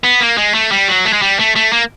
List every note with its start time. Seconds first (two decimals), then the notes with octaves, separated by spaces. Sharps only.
0.04 B3
0.20 A#3
0.38 G#3
0.54 A3
0.72 G3
0.88 F#3
1.05 A3
1.13 G#3
1.22 G3
1.39 A3
1.56 A3
1.73 A#3